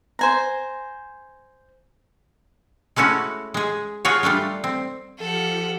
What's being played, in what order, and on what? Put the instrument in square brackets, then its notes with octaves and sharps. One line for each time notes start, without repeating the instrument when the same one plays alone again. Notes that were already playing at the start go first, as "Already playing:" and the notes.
[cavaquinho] C5 G#5 A#5
[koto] G#3 A3 C#4 E4 F#4
G#3 G#4
F4 F#4 G#4 C#5
G3 A3 D4 F4
C4
[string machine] F3 F4 G4 [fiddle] A4 F#5